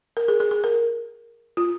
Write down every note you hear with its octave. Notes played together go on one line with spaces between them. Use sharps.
A#4
G#4
G#4
G#4
A#4
F4